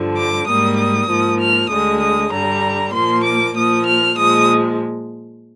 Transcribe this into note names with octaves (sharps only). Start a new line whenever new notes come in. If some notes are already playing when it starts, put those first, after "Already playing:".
Already playing: G2 D3 F3
D6
G#2 G3 A#3 D#6
D#6
G#2 F3 A#3
F6
D2 D3 G#3 D#6
D#6
G2 D3 G3 A#5
A#2 F3 A#3 C6
D6
A#2 F3 A#3 D#6
F6
A#2 F3 G#3 D#6